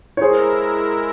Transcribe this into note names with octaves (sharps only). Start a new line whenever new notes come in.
C#5
G#3 E4 G#4 A#4 C5